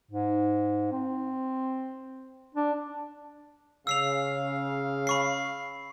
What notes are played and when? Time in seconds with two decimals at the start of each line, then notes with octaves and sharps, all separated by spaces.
0.11 G#2
0.92 C4
2.55 D4
3.87 C#3 F5 E6 C7 F7
5.07 B5 C#6 C7